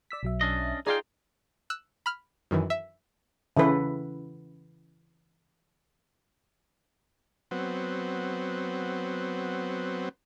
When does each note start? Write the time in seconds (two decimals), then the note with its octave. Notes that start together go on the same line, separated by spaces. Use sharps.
0.11 D5 E6 B6
0.23 B1 F#3 E5
0.41 C#4 D4 D#5
0.87 D#4 F4 G#4 D5 G5 F6
1.70 E6 F#6
2.06 B5 F6
2.51 F#2 D#3 E3
2.70 E5
3.57 C#3 E3 A4 B4
7.51 F#3 B3 C4